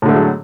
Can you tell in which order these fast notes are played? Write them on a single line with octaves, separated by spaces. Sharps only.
A2 D3 A3 G#3 F#3